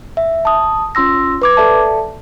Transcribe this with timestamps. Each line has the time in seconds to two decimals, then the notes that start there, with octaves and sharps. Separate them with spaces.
0.17 E5
0.45 A5 D#6
0.95 C#4 F4 C6 E6 A#6
1.42 B4 D6 G#6
1.57 A4 D5 E5 A5